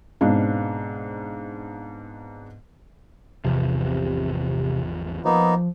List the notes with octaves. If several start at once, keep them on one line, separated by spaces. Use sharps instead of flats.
G#2 B2 C4 D4 F5
G#1 E2 C3 F3
F3 A#3 B3 D#4